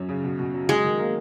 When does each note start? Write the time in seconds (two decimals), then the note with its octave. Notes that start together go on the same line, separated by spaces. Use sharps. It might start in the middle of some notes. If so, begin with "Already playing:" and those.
Already playing: F#2 C#4
0.09 C#3
0.24 B2
0.39 B2
0.54 F#3
0.69 G#3 G#4
0.84 D#3
0.99 A#3